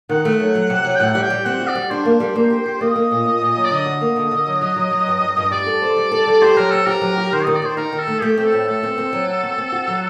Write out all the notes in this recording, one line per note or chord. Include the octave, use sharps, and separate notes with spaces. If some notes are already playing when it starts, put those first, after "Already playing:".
D#3 F#5
A3
F#3
F#3
C3
F#3
G5
A2 F#5
G3
G5
G3
C4 F#5
F#4
D5
G3
D4 C5
A#3
G3
A#3
G4
G4
A#3 D#5
A#3
A#2
A#2
A#2
F#3
D5
D3 D#5
F#4
A#3
D3
D3
F#3
F#3
F#3
F#3
G2
G2
G2
G3 D5
A4
C5
G3
A4
G3
G4 C5
F#3 A#4
C4 A4
G4 A#4
F#3
G4
D#3 C5
D#3 D#5
D5
D#3 C5
D#4 A#4
D#3
A4
A3
A3 G4
C4 G4
A4
A2
A3 A4
C4
C4
F#3
F#4
C4
C4
F#4
F#3